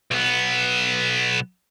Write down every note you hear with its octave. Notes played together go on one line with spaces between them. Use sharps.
B1 B3